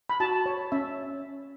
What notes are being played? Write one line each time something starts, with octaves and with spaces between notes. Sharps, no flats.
B5
F#4 A5
C#5
C#4 E5